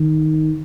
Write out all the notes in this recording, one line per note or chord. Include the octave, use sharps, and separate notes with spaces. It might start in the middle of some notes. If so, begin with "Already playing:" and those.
Already playing: D#3